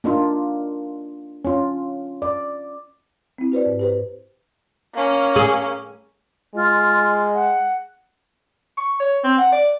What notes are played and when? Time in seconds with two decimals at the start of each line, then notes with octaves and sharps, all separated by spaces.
0.04 A#3 D4 D#4 F4
1.45 C#4 F4
2.22 D5
3.38 C4 E4
3.52 F#4 B4 C5 D5
3.66 G#2
3.79 G4 B4 C5
4.94 A#3 C#4
5.36 G#4
6.55 G#3 F4
7.34 F#5
8.77 C#6
9.00 C#5
9.24 C4
9.38 F#5
9.52 D5